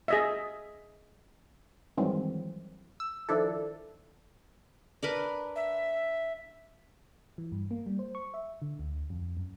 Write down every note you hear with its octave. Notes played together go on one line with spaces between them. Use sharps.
G#4 D#5 E5
G2 D#3 E3 F#3 G#3 C4
E6
D#3 F3 D4 E4 A4
D4 A#4 B4
E5
E3
G2
A#3
G3
C5
C#6
E5
D3
D2
F2
F#2